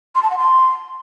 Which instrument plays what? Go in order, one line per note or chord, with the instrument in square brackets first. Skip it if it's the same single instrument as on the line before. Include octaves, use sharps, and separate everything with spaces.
[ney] C6
A5
F#5
C6